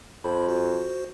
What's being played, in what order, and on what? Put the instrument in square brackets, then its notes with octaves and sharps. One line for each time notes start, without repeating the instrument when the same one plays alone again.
[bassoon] F2 [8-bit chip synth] C5 B5
[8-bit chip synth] F#4 C5